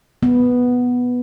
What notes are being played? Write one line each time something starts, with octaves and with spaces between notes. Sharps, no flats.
B3